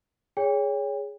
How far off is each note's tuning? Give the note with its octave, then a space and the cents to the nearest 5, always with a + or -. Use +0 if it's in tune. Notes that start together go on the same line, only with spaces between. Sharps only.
G#4 +0 C#5 +20 G5 +35